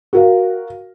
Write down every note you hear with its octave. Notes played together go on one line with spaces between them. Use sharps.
F#4 A#4 F5